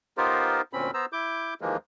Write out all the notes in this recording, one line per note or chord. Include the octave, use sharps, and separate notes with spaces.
B3 D#4 F4 G4 A#4 C5
D2 A#2 C4 C#4 B5
B3 C5 A#5 E6
E4 D6 G6
D#2 E3 F3 G#3 A#3